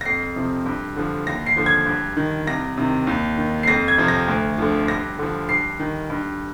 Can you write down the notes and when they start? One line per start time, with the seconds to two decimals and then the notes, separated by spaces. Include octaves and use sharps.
0.01 A#6
0.05 F2 C7
0.36 C3 F3
0.66 G2
0.96 D3 F3
1.26 D#2 A#6
1.46 C7
1.56 D3 F3
1.66 G#6
1.86 G2
2.17 D#3
2.47 C2 A#6
2.78 C3 D#3
3.07 D#2
3.38 D#3
3.63 C7
3.68 F2 A#6
3.88 G#6
3.98 C3 F3
4.08 A#6
4.28 D2
4.58 D3 F3
4.88 G2 A#6
5.19 D3 F3
5.49 G2 C7
5.79 D#3
6.10 G2